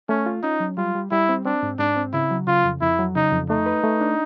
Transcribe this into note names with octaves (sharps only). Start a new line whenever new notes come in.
A3 C#4
F4
C#4 D#4
F#3
G3 F4
G3
G3 E4
C4
C4 D4
G#2
G#2 D4
C4
C#3 E4
F#3
C#3 F4
F2
F2 E4
F#3
C#3 D#4
F2
A3 D#4
B4
A3
D4